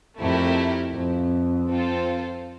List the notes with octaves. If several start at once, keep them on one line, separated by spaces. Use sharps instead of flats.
F2 A3 E4 G4 A#4
F2
C4 F4 A4 C5